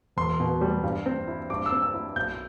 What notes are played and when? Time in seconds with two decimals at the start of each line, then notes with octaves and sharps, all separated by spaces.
0.17 E1 C6
0.40 B2
0.61 G3
0.83 G2
1.06 C4
1.28 E4
1.50 G2 D6
1.66 E6
1.72 C4
1.83 E6
1.94 E4
2.16 B1 G6